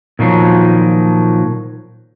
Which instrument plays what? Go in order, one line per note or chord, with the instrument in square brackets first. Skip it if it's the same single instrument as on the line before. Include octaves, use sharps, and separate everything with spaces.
[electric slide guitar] A#2 D#3 F3 F#3